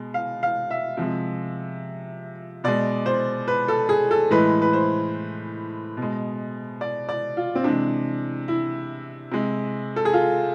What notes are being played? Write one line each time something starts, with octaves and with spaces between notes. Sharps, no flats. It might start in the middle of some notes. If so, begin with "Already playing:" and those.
Already playing: B2 G#3
F5
F5
E5
C3 F3 G#3
B2 G#3 D5
C5
B4
A4
G#4
A4
A2 E3 G#3 B4
B4
C5
B2
G#3
D5
D5
F4
C4
C3 E3 G#3 D4
E4
C3 G#3
A4
G#4
F4